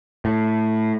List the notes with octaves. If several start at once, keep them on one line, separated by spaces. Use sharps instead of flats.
A2